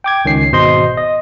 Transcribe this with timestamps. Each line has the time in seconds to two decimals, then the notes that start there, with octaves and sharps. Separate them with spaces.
0.04 G5 D6 G#6
0.25 C#2 D#3 C#4 C7
0.52 G#1 B2 C5 D#5 C6
0.97 D#5